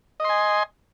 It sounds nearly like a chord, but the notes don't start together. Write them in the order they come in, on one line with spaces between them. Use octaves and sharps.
D#5 C6 G#5